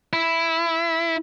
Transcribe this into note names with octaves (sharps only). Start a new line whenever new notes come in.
E4